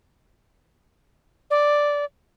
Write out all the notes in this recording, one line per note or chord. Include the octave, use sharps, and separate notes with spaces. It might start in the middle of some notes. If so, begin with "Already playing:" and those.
D5